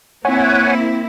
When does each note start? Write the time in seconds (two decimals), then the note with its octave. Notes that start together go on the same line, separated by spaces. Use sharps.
0.25 A#3 C4 E4 C#5 F#5 G#5